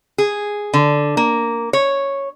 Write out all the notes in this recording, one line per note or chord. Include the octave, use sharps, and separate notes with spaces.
G#4
D3
A#3
C#5